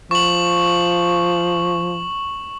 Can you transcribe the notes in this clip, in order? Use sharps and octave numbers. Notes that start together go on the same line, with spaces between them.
F3 C#6 F#7